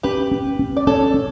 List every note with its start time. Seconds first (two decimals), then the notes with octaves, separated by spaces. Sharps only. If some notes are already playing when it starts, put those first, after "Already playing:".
0.03 C#4 G4 B4
0.31 C#4
0.59 C#4
0.77 D5
0.87 C#4 A4 C#5
1.14 C#4